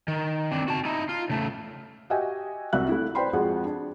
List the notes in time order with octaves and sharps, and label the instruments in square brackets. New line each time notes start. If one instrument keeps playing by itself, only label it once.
[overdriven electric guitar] D#3
C4 D4
F#4 A5
D#4 E4
F4
C#3 A3
[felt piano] F#4 G4 D#5 E5 G5 G#5
C2 C3 F#4 E5 F#6
A3 E4
C5 D5 G5 B5 C6
F2 F3 G#3 F#4 G#4 F#5
D4